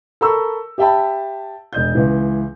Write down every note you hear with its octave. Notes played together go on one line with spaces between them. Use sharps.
A4 A#4 A#5 B5 C#6 E6
G4 E5 G5 A5 B5
E1 D#5 G6
C#2 E3